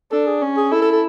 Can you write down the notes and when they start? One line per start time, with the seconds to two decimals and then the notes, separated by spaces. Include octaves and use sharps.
0.12 D4 A4
0.27 G#4
0.42 C#4
0.57 G#4
0.71 E4 A4
0.82 A4
0.92 A4